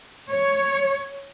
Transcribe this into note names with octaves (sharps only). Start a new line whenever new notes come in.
C#5